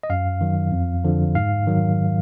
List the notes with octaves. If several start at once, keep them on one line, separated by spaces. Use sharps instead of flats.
D#5
F#2 F5
D#3 F#3
F2
D3 F3
G#2 F5
D#3 F#3